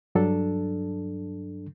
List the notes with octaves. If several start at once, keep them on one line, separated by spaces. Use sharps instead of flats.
G2 F#3 D4 A4